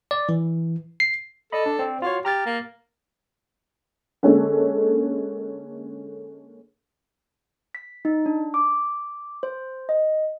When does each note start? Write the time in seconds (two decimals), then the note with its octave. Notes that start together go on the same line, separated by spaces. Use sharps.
0.11 D5
0.29 E3
1.00 C7
1.52 A4 D5 D#5 B5
1.66 D4
1.79 C4 D5
2.02 F4 F#4 C#5 F5
2.25 G4 A#5 F6 A6
2.46 A#3
4.23 D3 G#3 A#3 C#4 A4
7.75 B6
8.05 D#4
8.26 D4
8.54 D6
9.43 C5
9.89 D#5